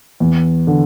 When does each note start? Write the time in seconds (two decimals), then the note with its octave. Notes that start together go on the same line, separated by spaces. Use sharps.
0.20 E2
0.67 D3